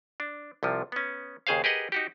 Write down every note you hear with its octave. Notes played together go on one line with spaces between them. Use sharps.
D4
C2 C3 F3
B3 C#4
D#2 C#3 G#4 C5 F5
G4 G#4 A#4 B4 D#5 F#5
D#4 F#4 G4